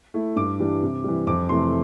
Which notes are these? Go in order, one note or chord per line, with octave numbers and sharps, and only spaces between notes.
A3 E4
G2 D6
E3 G3 D4
C3
E3 G3
F2 D6
C3 E3 A3 C6